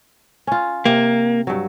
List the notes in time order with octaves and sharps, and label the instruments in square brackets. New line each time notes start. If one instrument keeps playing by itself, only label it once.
[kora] C#4 F4
[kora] C3 [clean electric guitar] A#3
[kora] G2 F#3